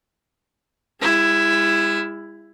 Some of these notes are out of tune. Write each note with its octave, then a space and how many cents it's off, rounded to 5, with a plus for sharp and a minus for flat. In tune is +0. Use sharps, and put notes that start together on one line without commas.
G#3 -40 E4 +10